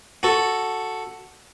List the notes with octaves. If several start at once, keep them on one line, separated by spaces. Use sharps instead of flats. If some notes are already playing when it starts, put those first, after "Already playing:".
F#4 A4